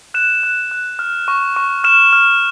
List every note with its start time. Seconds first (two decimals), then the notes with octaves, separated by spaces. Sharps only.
0.14 F#6 E7
0.43 F#6
0.71 F#6
0.99 F6
1.28 C#6
1.56 C#6
1.84 F6 E7
2.13 F6